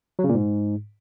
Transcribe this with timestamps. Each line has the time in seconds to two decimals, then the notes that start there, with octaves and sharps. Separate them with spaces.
0.19 F#3
0.24 C#3
0.29 A#2
0.34 G#2